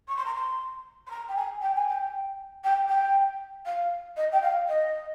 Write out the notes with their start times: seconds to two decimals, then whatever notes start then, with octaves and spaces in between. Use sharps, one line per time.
0.08 C#6
0.17 C6
0.26 A#5
0.35 C6
1.07 C6
1.11 A#5
1.29 G5
1.36 G#5
1.62 G5
1.75 G#5
1.89 G5
2.64 G5
2.89 G5
3.66 F5
4.17 D#5
4.32 G5
4.42 F5
4.68 D#5